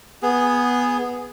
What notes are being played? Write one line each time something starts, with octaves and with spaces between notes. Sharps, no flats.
B3 G#4